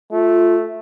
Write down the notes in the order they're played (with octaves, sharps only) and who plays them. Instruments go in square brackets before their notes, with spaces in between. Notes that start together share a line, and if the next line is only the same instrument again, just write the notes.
[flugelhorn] A3 [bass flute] F4